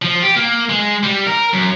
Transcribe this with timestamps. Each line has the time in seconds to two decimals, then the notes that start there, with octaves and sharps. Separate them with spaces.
0.02 F3
0.22 G4
0.36 A#3
0.69 G#3
1.03 G3
1.27 A#4
1.53 F#2